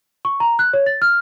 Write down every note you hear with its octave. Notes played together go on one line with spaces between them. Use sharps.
C#6
A#5
F#6
C#5
A6
F6